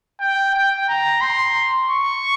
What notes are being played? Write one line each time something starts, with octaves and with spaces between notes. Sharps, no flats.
G5
G5
A#5
C6
C#6